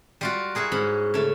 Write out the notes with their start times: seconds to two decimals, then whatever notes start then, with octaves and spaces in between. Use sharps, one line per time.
0.21 G3 F4 F#4
0.55 E4 F#4 G#4 A#4
0.72 G#2 C#4 B5
1.14 C#3 A3